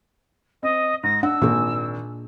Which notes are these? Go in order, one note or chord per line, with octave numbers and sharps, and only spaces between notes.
C4 D#5
G#2 A#6
D4 F#5 E6
G#1 A#2 G#4